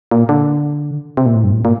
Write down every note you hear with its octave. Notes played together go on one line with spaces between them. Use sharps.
A#2
D3
C3
A#2
A2
G2
A2
A#2